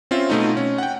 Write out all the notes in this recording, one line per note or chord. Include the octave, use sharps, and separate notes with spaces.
C4 C#4 F4 E5
B2 A3 D#4
C#4
F#5 G5